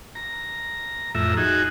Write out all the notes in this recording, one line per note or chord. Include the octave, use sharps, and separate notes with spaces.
A#5
F2 A2 E5 A#5
D#4 F#4 G#4